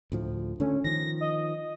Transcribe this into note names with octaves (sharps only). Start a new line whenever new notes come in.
D2 A2 F3
D3 A3 C#4
D#3 F3 A#6
D#5